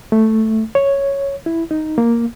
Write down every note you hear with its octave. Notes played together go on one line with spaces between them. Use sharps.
A3
C#5
E4
D#4
A#3